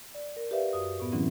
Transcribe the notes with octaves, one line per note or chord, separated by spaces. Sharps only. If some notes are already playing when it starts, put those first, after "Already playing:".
D5
A#4
G4 B4 D5 E5 F5
F#2 F#4 D#6
A2 B3
D3 E3 F#3 C4 C#4 E4